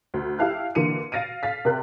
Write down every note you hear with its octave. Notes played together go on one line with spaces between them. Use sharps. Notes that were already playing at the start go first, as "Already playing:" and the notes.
D2
E4 G4 E5 F5 A5 F#6
D3 E3 A#3 C#7 D#7
F5 A6 A#6 D7 D#7
F5 A6 B6
C3 A#4 F#6